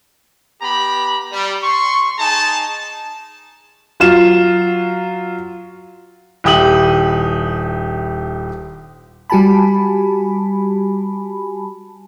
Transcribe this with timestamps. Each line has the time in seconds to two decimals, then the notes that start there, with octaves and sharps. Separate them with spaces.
0.62 B3 G4 A#5 B5
1.31 G3
1.62 C6 C#6
2.19 D#4 G#4 A5
4.00 F#3 F4 E7
6.44 D#1 E4 G4 D#6 F#7
9.30 G3 F#4 G4 G#5 A5 B5